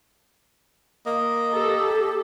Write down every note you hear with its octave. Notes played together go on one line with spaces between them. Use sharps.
A#3 D#5
G4 A4